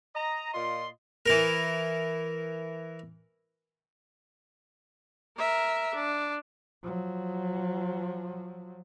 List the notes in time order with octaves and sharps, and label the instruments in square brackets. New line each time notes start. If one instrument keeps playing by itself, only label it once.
[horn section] D#5 A#5
A#2 F4 D#5 C6
[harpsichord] E3 A#4
[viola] A#4 E5
D4
[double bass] F3 F#3